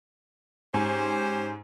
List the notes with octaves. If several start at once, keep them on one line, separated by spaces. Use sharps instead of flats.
G#2 C#4 G4 C5 G#5